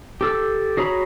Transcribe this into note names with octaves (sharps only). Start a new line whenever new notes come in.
G4 A4 E6
F#4 G#4 C#5 A#5 B5